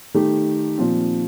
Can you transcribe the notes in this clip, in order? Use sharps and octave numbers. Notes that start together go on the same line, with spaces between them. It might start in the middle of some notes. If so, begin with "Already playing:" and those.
D#3 A3 D#4 G4
A#2 F3 C4